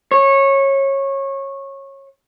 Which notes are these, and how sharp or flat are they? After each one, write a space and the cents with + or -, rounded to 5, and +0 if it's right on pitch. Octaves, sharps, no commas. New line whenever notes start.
C#5 -20